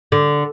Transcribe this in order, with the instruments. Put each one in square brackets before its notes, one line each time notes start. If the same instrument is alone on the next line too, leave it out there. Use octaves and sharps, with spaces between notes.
[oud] D3